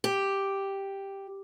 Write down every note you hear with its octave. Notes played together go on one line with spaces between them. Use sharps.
G4